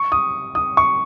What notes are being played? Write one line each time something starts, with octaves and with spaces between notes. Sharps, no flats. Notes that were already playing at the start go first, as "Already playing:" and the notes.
Already playing: C#6
D#6
D#6
C#6